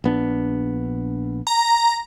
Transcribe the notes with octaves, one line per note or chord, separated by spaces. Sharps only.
A#1 B3 D4
A#5